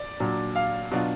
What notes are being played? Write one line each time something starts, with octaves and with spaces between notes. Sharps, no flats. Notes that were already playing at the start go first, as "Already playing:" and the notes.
Already playing: D5
A#2 F#3 D4
F5
B2 F#3 D4 F4